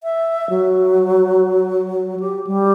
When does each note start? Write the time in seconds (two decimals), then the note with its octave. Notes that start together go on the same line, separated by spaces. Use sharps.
0.03 E5
0.50 F#3
2.20 G4
2.47 G3